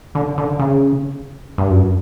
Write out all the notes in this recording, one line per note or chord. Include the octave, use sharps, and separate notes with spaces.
D3
D3
C#3
G2
F#2